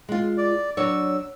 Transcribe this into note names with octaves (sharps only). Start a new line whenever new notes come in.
G#3 F4
D5
F#3 D4 C#5 E6